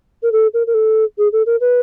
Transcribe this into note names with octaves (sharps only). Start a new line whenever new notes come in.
A#4
A4
A#4
A#4
A4
G#4
A4
A#4
B4